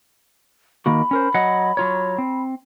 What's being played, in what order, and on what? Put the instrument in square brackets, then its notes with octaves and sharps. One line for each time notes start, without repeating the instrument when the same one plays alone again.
[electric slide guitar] D#3 A#3 F#4 [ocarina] B5
[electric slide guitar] C#4 A#4 C5
F#3 D#5 F#5
F#3 F4 C#5
C4